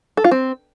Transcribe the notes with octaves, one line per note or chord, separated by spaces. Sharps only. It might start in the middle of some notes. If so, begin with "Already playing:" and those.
A4
F4
C4